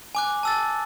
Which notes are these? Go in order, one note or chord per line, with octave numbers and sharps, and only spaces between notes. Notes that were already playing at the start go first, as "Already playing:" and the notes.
G#5 D6 F#6
A5 E6 A6